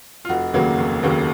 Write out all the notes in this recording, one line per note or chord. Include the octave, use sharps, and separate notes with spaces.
F4
F1 F#4
D#2 C#3 F#3 A#3
F1
D#2 C#3 F#3 A#3